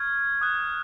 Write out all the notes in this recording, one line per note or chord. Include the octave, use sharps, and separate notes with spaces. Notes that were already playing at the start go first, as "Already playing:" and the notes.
Already playing: C#6 F6 G#6
D#6 F#6